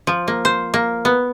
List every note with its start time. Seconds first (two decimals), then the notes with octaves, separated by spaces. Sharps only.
0.07 F3
0.28 A#3
0.45 C5
0.74 A#3
1.05 B3